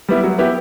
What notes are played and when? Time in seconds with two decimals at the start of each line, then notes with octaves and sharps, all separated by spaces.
0.09 G3 B3 E4
0.24 F#3
0.38 B3 E4 G4